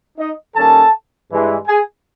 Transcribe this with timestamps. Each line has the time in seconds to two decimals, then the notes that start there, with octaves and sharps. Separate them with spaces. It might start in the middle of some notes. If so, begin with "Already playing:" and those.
0.18 D#4 D#5
0.56 D#3 G3 A#3 C#4 A4 A5
1.30 G2 E3 G#3
1.68 G#4 G#5